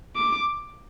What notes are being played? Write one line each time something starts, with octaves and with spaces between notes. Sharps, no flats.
D6